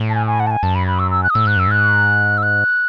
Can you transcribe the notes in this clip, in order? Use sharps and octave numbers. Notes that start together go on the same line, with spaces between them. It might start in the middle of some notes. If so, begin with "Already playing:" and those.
Already playing: A2
A5
G#5
G#5
F#5
A5
G#5
F#2 A5
B5
B5
E6
E6
F#6
D#6
A2 E6
G#2 F#6
F#2 E6
G#2 F#6
E6
F#6